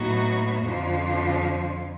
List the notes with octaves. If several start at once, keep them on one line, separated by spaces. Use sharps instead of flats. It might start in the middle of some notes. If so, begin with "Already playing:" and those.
Already playing: A2 F#3 B3 D#4 F#4
F2 D3 F3